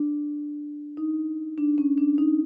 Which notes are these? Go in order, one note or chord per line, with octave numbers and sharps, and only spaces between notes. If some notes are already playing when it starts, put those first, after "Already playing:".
Already playing: D4
D#4
D4
C#4
D4
D#4